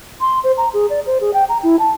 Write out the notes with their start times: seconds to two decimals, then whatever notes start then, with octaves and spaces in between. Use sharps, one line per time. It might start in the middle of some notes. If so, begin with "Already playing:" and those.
0.21 C6
0.44 C5
0.57 A#5
0.74 G#4
0.90 D5
1.07 C5
1.20 G#4
1.34 G5
1.49 A#5
1.63 E4
1.79 A5